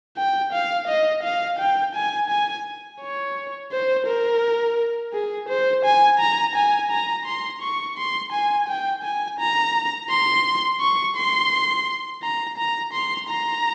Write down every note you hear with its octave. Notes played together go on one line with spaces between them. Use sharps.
G5
F5
D#5
F5
G5
G#5
G#5
C#5
C5
A#4
G#4
C5
G#5
A#5
G#5
A#5
C6
C#6
C6
G#5
G5
G#5
A#5
C6
C#6
C6
A#5
A#5
C6
A#5